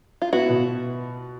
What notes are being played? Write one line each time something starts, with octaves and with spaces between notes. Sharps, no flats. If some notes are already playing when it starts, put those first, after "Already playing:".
F4
B3 E4 F#4
B2